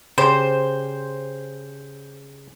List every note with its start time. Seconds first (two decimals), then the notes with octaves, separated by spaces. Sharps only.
0.18 C#3 G4 C5